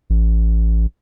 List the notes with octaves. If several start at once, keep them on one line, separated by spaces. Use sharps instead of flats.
A1